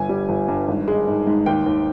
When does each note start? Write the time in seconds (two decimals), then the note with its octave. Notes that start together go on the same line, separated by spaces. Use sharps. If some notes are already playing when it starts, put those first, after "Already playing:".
Already playing: G1 G#5
0.09 G3
0.29 G1
0.48 G2
0.68 G#1
0.88 G#3
1.08 G#2
1.27 G#2
1.46 D#2 G5
1.66 D#2